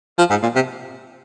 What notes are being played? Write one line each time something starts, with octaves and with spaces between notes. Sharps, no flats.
F3
G#2
A#2
C3